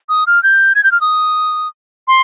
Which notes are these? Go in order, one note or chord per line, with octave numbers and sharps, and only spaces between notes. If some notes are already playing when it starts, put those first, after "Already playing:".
D#6
F6
G6
G#6
G6
F6
D#6
C6